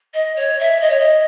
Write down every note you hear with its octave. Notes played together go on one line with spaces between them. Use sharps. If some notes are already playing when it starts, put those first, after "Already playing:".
D#5
C#5
E5
D#5
C#5
D#5